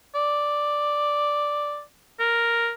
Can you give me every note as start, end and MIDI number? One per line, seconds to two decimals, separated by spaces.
0.15 1.82 74
2.20 2.71 70